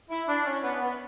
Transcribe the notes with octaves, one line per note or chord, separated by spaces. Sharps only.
E4
D4
C#4
B3
B3